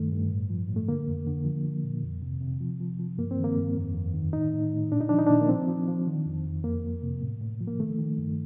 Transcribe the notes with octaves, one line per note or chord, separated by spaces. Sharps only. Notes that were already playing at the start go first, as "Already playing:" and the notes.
Already playing: G2 D#3 A3
G2
A2
F3
A2
A3
D3 A#3
F2
D3
F3
F3
A#2
F2
C3
C3
F3
F3
F3
G2 A#3
C4
D#3
A#3
G2
F2
F2
D#3
A2 D#4
A2
A2
A#2 D4
D#4
F3 D4
D#4
D4
A#2
A#3
F3 C4
F3
F3
D#3
F2
F2
F2 A#3
F3
C3
A2
A2
F3
A#3
D#3 A3
D#3
G2